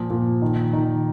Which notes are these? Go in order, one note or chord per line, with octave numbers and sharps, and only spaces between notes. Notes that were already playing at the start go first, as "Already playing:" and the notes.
Already playing: A#2 F3
A#2
D#3
D#3